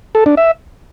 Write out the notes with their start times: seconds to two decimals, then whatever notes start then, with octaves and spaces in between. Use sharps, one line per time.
0.15 A4
0.26 D4
0.37 E5